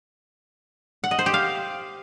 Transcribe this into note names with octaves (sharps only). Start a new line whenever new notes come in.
F#5
D#5
C5
G4
F5